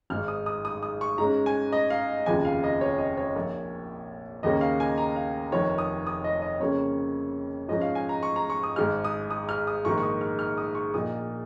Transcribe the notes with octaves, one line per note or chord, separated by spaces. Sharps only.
G#1 G#2 G#3 D#4 F6
D#6
D#6
D#6
D#6
C#6
G#2 G#3 C#4 A#5
G#5
D#5
F5
F1 D#2 C#3 F3 G#5
F5
D#5
C#5
D#5
C#5
A#1 A#2 A#3
D#2 C#3 A#3 C#4 D#5
F5
G#5
A#5
F5
F1 F2 D#3 C#5
D#6
D#6
D#5
D#5
F2 C#3 A#3 C#4 C#5
G#2 F3 C#4 D#5
F5
G#5
A#5
C#6
A#5
C#6
D#6
G#1 G#2 G#3 F6
D#6
D#6
F6
D#6
A#1 G#2 D#3 A#3 C#6
C#6
D#6
F6
F6
D#6
C#6
A#1 A#2 A#3 D#4 D#6